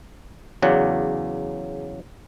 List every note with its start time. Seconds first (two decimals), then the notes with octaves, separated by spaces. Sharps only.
0.62 E2 C#3 F#3 D5 F#5